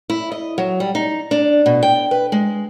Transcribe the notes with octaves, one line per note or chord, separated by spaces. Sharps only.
E4
D#5
F#3
G3
D#4
D4
B2
G5
B4
G#3